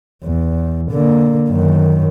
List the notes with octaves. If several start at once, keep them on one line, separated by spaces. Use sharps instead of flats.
E2
D3 A#3
F#2 D#3